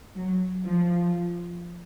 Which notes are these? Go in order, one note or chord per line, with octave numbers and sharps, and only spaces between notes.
F#3
F3